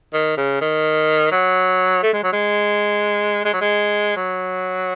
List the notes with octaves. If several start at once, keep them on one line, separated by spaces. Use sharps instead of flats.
D#3
C#3
D#3
F#3
A3
G#3
F#3
G#3
G#3
F#3
G#3
F#3